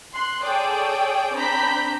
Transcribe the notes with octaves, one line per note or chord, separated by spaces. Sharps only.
C6 F#6
G#4 A4 C#5 D5 G5 D#6
C4 D4 A#5 B5 G6 B6